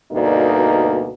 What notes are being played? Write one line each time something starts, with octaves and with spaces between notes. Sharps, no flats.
D2 G2 B2 A#3 D#4